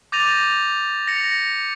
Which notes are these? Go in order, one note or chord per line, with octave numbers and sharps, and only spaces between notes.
D6 G6 A6 A#6 D#7 F7
A#6 C#7 F7